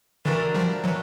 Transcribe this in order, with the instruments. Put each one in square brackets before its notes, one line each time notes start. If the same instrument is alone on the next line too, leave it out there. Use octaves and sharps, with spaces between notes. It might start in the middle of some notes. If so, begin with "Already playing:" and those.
[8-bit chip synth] D3 E3 [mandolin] A3 D4 F#4 A#4
[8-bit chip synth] F3 G3
E3 F#3